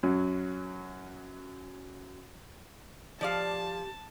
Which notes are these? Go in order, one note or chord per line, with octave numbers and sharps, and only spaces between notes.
F#2 F#3
F3 G4 D5 F5 A5